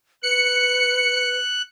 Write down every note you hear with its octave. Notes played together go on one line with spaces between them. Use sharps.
B4 F#6 C#7